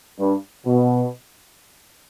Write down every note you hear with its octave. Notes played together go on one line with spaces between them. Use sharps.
G2
B2